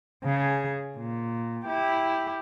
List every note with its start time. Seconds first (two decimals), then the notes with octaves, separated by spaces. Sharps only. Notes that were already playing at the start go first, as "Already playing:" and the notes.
0.25 C#3 G#4
0.97 A#2
1.66 E4 G4